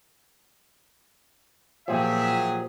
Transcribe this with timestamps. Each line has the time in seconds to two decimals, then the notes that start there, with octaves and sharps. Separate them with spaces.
1.88 A#2 F3 F#3 G4 G#4 E5